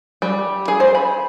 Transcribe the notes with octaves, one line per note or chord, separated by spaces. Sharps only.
G3
G#4
C5
B5